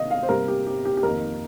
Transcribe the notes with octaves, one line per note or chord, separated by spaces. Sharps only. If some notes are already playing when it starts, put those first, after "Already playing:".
Already playing: C3 D#3 A#3 D#5 F5
F5
C5
C3 G3 A#3 A#4
G4
G4
G4
G4
F2 D#3 A#3 A#4